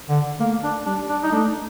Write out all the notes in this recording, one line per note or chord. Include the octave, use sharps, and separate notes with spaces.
D3
A3 A#3
D4
G3 D4
D4
D#4
A3 D4